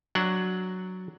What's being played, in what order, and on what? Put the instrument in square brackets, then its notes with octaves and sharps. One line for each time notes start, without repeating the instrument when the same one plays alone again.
[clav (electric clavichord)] F#3 D4 F#5